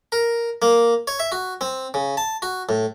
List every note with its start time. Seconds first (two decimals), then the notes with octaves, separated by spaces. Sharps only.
0.12 A#4
0.62 A#3
1.08 C#5
1.20 E5
1.32 F#4
1.61 C4
1.94 C#3
2.17 A5
2.42 F#4
2.69 A2